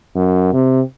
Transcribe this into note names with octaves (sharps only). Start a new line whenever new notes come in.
F#2
C3